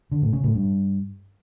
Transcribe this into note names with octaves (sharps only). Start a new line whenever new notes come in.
D3
A2
C#3
A2
G2